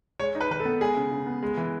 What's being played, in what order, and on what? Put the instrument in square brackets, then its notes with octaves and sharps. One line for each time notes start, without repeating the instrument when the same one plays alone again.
[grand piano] G#3 C#5
D#4
B4
D#3 B4
A4
B3
G#3 G#4
C#3
C#3
B3
G#3
E3